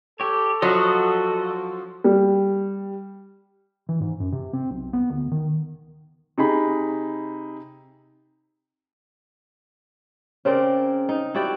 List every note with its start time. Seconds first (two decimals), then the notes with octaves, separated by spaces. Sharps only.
0.20 G4 A4 C#5
0.62 F3 F#3 F#4 D#5
2.04 G3
3.89 E3
4.00 G#2
4.20 F#2
4.32 C3
4.53 C4
4.71 B1
4.93 B3
5.10 D2
5.31 D#3
6.38 C3 D#4 G#4 B5
10.45 C#3 C4 A#4 D5
11.09 D#4
11.34 E4 F#4 G4 D5